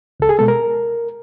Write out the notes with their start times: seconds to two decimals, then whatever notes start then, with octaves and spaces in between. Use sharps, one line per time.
0.20 C#2 A4
0.29 G#4
0.39 B2 G#3 B3 A4
0.48 A#4